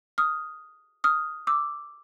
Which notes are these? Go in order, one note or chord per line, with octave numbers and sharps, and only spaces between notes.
D#6 F6
D#6 F6
D6 E6